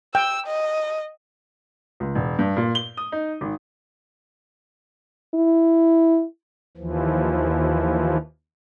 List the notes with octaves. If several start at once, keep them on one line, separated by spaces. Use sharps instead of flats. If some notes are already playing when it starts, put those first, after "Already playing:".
G5 E6
D#5
C#2
E1
G2
A#2
G7
D#6
D#4
G#1
E4
D#2 E3 F3